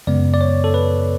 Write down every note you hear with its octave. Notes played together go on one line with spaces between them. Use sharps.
F#2 C#3 G#3 B3 D5
D5
C#5
A4
B4